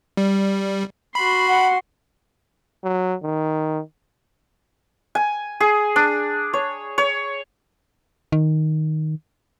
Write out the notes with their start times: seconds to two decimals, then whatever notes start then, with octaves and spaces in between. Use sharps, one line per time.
0.17 G3
1.15 F#4 B5 C6
1.48 F#5
2.84 F#3
3.22 D#3
5.15 G#5
5.60 G#4
5.96 D4
6.53 C#5
6.98 C#5
8.32 D#3